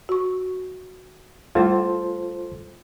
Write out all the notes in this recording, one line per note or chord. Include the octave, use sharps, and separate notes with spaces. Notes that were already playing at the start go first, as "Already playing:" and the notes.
F#4 C#6
G3 A3 E4 F4 A4 C5